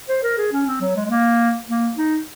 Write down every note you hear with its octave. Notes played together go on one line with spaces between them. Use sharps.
C5
A#4
G#4
C#4
C4
F#3
G#3
G#3
A#3
A#3
D#4